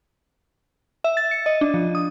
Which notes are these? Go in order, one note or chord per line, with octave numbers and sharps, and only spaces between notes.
E5
A6
C#7
D#5
D4
F3
D#6